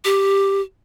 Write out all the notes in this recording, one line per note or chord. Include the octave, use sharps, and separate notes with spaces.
G4